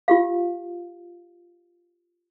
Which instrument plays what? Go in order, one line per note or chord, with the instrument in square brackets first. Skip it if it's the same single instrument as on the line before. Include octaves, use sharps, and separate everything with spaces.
[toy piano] F4 G4 F5